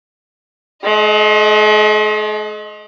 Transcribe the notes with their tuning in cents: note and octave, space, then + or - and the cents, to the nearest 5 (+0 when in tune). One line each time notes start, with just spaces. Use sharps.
G#3 +45 D#5 +0